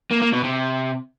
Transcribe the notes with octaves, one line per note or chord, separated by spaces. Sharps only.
A#3
A#3
B2
C3